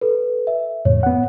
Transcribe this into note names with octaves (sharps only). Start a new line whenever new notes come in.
A4 B4
E5
F2 A2 C#3 C#5
B3 F#5